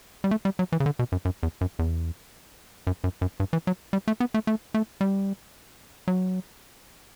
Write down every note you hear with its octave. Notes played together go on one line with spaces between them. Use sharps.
G3
A3
G3
F#3
E3
C#3
D3
B2
F#2
F#2
E2
F#2
E2
F#2
F#2
F#2
G2
E3
F#3
G3
A3
B3
A3
A3
A3
G3
F#3